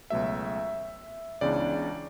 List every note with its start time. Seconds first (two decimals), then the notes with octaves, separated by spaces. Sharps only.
0.10 C#2 B2 F#3 A3 E5
1.41 C#2 C#3 E3 B3 D4 D5